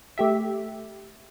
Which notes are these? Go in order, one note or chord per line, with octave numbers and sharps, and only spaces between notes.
A3 G4 E5